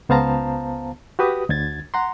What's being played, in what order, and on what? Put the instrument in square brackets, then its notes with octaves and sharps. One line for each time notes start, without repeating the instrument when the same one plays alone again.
[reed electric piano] C#2 B3 C5 F5 A5 A#5
F#4 G4 B4 D#6
D2 D3 G#6 A6
F#5 A#5 C6